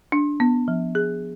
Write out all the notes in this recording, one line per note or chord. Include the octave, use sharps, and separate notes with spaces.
D4
B3
F3
G#4